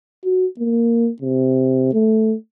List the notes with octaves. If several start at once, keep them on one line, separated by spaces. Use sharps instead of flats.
F#4
A#3
C3
A3